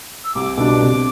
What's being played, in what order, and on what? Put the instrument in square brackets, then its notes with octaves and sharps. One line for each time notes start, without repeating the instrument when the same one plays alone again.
[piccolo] E6
[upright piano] C2 [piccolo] D6
[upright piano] B2 G3 D4
C3